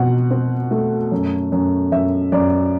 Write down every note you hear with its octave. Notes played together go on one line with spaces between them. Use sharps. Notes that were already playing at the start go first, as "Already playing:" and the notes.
Already playing: B2 C4 F#5
C4
A3
F#2
F#2
F#2 E5
F#2 D5